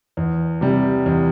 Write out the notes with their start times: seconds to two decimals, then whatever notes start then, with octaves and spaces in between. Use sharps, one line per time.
0.17 E2
0.61 C3 G3
1.06 E2